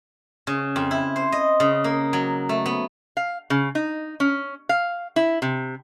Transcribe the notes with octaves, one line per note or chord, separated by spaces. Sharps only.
C#3
F2
E4
C5
D#5
C#3
A#3
F#3
A3
B3
F5
C#3
D#4
C#4
F5
E4
C3